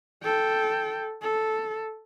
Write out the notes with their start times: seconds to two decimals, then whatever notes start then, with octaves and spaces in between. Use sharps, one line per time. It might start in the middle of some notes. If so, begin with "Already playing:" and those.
0.23 A4 G5
1.22 A4